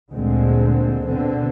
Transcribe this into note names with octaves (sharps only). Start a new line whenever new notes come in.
D2 A#2 D3 G#3 C4
B2 D3 C4